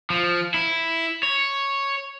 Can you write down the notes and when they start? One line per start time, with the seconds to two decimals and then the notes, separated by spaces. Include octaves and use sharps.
0.10 F3
0.54 E4
1.23 C#5